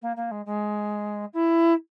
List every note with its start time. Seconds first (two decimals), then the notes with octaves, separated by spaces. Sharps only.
0.02 A#3
0.16 A#3
0.31 G#3
0.45 G#3
1.33 E4